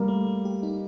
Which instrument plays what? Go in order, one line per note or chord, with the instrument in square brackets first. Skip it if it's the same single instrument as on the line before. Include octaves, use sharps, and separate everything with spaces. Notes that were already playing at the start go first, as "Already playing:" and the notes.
Already playing: [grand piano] G3 A#3
[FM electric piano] A3
A3
G4
D#4